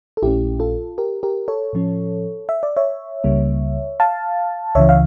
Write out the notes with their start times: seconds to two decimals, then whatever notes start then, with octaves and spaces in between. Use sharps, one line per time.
0.17 A4
0.22 A#1 A#2 A3 C#4 E4 G4
0.60 F4 A4
0.98 G4 A#4
1.23 G4 A#4
1.48 A4 C#5
1.73 A2 F3 C#4
2.49 E5
2.63 D5
2.77 C#5 E5
3.24 C#2 C#3 G3 A#3
4.00 F5 A5
4.75 C#2 C#3 E3 C#5 E5
4.89 F5